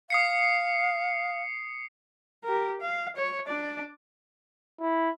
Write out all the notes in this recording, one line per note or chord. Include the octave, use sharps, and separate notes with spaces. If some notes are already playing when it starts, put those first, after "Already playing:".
F5 D#6 C7 C#7
G4 A#4
F5
C#5
D4 D5
E4